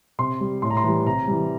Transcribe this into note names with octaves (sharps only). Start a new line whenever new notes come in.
C3 C6
G3
A2 C6
A#5
C6
E3 G3
C3 A#5
E3 G3